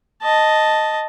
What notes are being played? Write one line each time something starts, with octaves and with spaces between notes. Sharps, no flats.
D#5 A5